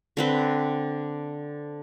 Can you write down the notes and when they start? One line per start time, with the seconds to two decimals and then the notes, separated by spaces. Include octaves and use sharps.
0.17 D3 C4 B4